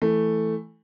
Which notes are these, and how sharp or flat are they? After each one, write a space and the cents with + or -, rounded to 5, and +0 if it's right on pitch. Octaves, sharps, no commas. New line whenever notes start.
E3 +0 A3 +0